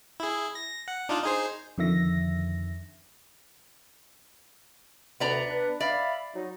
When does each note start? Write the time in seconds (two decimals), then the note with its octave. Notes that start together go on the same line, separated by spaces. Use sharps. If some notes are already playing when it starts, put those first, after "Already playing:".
0.20 E4 G#4
0.55 A#6
0.88 F#5
1.09 D4 D#4 F4
1.24 D#4 G#4 C5
1.78 F2 D3 D#3 E5 A#6
5.20 D2 C3 B3 D5 A#5
5.49 D4 B4
5.80 D5 E5 F5 B5
6.35 F#3 D#4